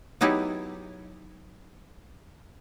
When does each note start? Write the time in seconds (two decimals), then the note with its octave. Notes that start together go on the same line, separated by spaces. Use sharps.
0.21 F#3 B3 D#4 E4 G4 G#4